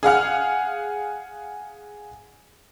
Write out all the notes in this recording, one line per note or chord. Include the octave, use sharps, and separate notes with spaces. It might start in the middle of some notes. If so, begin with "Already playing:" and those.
G#4 F5 F#5 F6